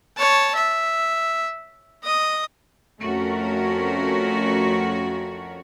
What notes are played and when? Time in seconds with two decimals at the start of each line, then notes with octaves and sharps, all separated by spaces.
0.17 C#5 A5
0.54 E5
2.03 D#5 D#6
3.01 F2 A3 C#4 F#4 A#4